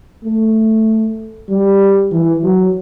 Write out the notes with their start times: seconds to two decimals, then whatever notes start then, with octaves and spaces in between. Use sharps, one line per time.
0.24 A3
1.49 G3
2.11 E3
2.43 F#3